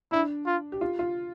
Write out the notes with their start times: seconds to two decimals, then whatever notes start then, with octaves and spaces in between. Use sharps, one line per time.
0.11 D4 E4
0.46 F4
0.72 G4
0.81 F4
0.99 F4